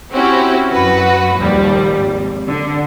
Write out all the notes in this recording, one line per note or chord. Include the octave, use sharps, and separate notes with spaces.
C4 C#4 E4 F#4 G4
F#2 F#4 B4
A#1 D#2 F3 G3
G#1
D3